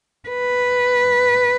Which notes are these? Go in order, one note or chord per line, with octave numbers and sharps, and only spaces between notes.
B4